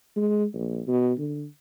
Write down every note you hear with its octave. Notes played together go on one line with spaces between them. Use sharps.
G#3
A#1
B2
D3